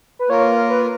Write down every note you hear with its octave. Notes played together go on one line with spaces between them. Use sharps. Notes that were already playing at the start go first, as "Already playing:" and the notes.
B4
A#3 F4 A#4 C#5
B4